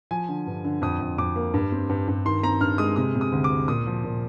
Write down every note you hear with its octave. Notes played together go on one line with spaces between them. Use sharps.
F3 G#5
D3
G2
D3
F2 D#6
F2
F2 D6
A#3
G2
C4
G2
G2
D#3 C6
C4 A#5
G2 F6
G#3 D#6
C3 D#6
C3
D#6
D2
D6
D2
A#2 D#6
F3
A#2